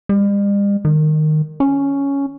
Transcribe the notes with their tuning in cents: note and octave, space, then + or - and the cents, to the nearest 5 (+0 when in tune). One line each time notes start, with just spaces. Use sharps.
G3 +45
D#3 -15
C#4 +5